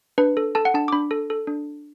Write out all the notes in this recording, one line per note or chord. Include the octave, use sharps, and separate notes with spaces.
D4 B4
A4
A4 A5
F#5
D4 A5
D6
D4 B5
A4
A4
D4